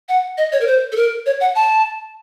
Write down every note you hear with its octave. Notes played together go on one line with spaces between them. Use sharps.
F#5
D#5
C#5
A#4
C5
A4
A#4
C#5
F#5
A5